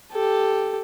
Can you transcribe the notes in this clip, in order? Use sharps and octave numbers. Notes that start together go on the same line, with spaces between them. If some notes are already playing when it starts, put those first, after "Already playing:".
G4 A4